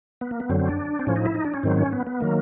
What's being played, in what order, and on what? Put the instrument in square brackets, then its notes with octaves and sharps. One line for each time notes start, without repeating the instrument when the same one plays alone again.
[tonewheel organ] B3
A#3
B3
F#2 D3 F#3 C4
C4
D4
C4
A2 F3 C#4
D#4
E4
D#4
D4
C#4
G#2 D#3 F#3 C4
C#4
B3
B3
D#3 F#3 A#3